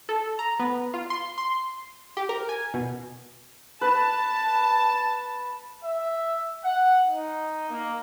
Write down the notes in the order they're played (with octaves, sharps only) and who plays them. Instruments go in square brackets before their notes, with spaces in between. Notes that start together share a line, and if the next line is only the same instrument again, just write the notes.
[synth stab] A4
A#5
B3
F4
C6
C6
G4
A#4
G#5
B2
[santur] B4 [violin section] A5
[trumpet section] E5
F#5
D#4
A#3